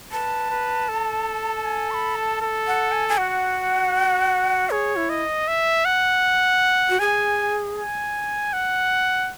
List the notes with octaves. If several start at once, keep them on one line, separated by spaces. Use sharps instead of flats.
B4 A5
B4
A4
G#5
C#6
B5
A5
A4
F#5
G#5
G#5
F#4 F#5
G#4 C#5
E4
D#5
E5
F#5
F#4
G#4 G#5
G#5
F#5